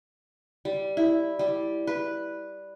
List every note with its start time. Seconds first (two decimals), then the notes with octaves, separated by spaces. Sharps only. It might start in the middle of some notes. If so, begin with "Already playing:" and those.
0.65 G3
0.97 E4
1.39 G3
1.87 B4